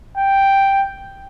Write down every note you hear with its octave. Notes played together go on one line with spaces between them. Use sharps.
G5